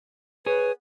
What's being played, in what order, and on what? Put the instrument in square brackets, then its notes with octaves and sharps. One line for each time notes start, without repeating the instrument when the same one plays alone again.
[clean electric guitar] G#4 C#5 [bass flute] B4